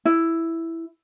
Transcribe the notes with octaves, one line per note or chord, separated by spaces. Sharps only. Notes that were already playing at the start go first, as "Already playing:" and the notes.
E4